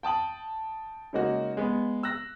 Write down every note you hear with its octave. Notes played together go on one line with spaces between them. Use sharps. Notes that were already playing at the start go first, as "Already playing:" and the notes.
G5 A5 D#6 F#7
C#3 G#3 A#3 D#4 F#4
G#3 B3
E6 F#6 A#6